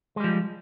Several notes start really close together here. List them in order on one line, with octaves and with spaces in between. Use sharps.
G#3 G3 F3